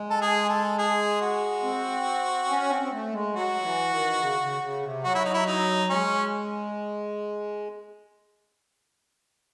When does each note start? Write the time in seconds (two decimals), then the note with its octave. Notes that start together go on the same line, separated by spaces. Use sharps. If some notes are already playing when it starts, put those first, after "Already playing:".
Already playing: G#3
0.10 A4
0.22 G#4
0.49 A4
0.79 G#4
1.21 F#4
1.63 C4
2.49 C#4
2.70 C4
2.82 C4
2.92 A3
3.13 G#3
3.34 F#3 F#4
3.62 E3
3.90 D#3
4.19 C#3
4.40 C#3
4.62 C#3
4.82 C3
5.04 F#3 F#4
5.15 E4
5.25 D#4
5.34 E4
5.46 D#4
5.89 G#3 C#4